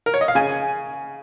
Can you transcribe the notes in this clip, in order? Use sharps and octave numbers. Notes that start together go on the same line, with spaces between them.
A#4
C#5
D#5
F5
C#3 G#5